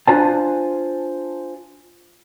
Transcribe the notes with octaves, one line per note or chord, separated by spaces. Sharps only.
D4 F4 B4 C5 G#5 A5